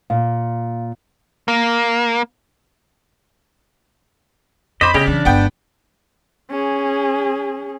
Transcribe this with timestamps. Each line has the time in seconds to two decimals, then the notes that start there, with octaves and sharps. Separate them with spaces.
0.10 A#2 F5
1.48 A#3
4.81 F2 C5 D#5 B5 D6 B6
4.94 C#3 A3 C#4 G4 D#5
5.08 E3 F#3 D4
5.25 G1 G#3 B3 G5
6.51 C#4 G#4